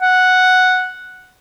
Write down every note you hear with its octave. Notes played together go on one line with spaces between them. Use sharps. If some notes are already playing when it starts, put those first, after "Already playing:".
F#5